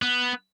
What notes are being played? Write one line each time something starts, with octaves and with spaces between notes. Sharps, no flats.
B3